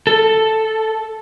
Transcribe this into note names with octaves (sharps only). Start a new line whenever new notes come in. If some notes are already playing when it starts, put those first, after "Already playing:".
A4